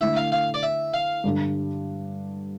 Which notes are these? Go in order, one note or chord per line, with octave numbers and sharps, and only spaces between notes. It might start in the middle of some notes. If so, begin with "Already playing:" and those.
D3 A3 E4 E5
F5
F5
D5
E5
F5
G2 D3 G3 D4